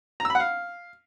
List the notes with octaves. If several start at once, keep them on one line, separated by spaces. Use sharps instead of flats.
A#5
E6
B5
F#5
F5